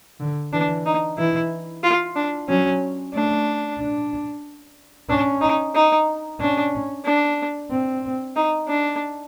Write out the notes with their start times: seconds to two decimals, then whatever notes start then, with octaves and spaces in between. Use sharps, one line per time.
0.20 D3
0.53 E3 D4
0.86 D#4
1.18 E3 E4
1.83 F4
2.16 D4
2.49 F#3 C#4
3.14 A3 D4
3.79 D4
5.09 C#4 D4
5.42 D#4
5.75 D#4
6.40 C#4 D4
7.05 D4
7.71 C4
8.36 D#4
8.68 D4